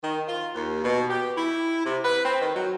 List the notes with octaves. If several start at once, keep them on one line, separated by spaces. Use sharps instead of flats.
D#3
F4
D#2
B2
G4
E4
C3
B4
C4
D#3
F#3